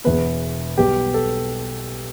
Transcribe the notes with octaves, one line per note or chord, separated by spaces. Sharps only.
E1 E2 E3 B3 B4
B1 B2 G3 B3 G4
A4